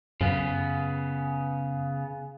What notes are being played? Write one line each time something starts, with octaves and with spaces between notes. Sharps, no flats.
F#2 C#3 B3